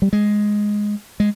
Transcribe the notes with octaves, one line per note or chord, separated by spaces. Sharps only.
G3
G#3
G#3